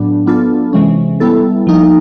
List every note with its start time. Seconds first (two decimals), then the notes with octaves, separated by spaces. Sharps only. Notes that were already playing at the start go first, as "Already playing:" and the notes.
Already playing: A2 F#3 B3 D4
0.26 F#3 B3 D4 F4 A4
0.73 C3 E3 G#3 C#4
1.20 G3 B3 E4 A4
1.67 F3 A#3 D#4